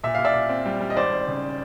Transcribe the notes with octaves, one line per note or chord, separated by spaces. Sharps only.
A#2 E5
A#2 F5
D5 E5
A#2
C4
G3
G3
D#5
G#1 C5 D5
G#1
C#3